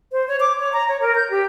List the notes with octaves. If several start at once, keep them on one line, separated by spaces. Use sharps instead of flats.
C5
C#5
D6
C#5
A#5
C#5
A#4
G6
G4